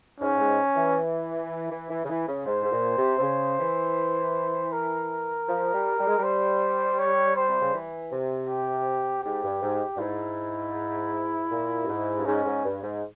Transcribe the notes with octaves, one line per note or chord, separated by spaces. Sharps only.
G#2 C#4
G#2
E3
E3
E3
C#3
E3
C#3
G#2 C5
G#2
A#2
C3
C3
C#3
E3
A#4
F3
G3
G3
G#3
G3
C5
C#5
C5
C3
C#3
E3
C3
G4
G#2 G4
G2
G#2
G2
G#2 E4
A#2
G2
G#2
G2
G#2 C#4
G#2
G2
G#2